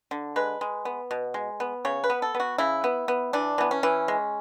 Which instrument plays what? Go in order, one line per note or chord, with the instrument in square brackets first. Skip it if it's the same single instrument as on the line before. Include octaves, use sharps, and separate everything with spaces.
[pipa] D3
G#3 B4
G#3
B3
B2
G#3
B3
C#3 C#5
B4
B3
A4
B3
F#4
C#3 E4
B3
B3
E3 D4
E3 B3
C#4
E3
G#3